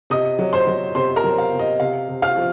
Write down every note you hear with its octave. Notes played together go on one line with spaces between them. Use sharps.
C3 D#5 D#6
F#3
C5 C6
F#3
C3 C5 C6
A#4 A#5
F#3
F5
C3
D#5
C3 F5
C3
F5 F6
F3